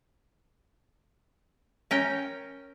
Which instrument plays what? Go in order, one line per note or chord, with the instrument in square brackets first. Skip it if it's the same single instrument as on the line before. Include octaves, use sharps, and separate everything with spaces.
[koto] C#4 A#4 G5